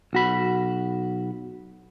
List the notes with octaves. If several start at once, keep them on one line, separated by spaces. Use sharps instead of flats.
B1 F#4 B5